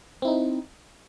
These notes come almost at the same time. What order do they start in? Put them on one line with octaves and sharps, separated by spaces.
C4 E4 D#4